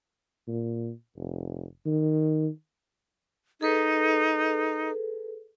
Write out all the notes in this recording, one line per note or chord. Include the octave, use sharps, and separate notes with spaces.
A#2
F1
D#3
D#4 G#4 A4 B4